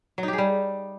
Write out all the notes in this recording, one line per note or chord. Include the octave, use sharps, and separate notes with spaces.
F#3
D#4
G4
G#4
G3